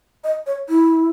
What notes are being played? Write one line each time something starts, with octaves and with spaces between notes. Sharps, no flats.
D#5
C#5
E4